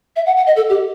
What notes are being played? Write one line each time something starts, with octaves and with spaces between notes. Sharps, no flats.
E5
F#5
F#5
D#5
A4
G4